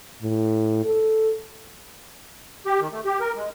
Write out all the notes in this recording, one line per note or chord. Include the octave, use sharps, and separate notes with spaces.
A2
A4
G4
D#3
A3
G4
A#4
G#3